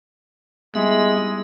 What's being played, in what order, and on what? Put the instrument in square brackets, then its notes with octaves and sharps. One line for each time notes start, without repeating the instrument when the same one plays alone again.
[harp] G3 D#4 E4 [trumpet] G#3 [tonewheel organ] B3 E5